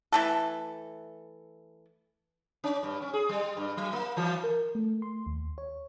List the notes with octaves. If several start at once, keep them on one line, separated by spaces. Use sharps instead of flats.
E3 A3 A4
C#4
G2
C#4
G#4
G3
G2
F#3
A#3
E3
A#4
A3
C6
D#2
C#5